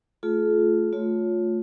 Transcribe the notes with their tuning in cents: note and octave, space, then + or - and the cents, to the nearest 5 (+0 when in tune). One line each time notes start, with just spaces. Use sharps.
A3 +0 F4 +0 G#4 +45
A3 +0 F4 +20 C#5 +0